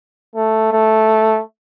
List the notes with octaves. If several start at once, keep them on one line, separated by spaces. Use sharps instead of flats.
A3
A3